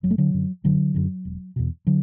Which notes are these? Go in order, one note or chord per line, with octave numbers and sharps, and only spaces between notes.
F#1 F#3
A3
D3 F#3
F#2 D3
F#1 D3 F#3
F#2 D3
E1
E2 B2
D3 F#3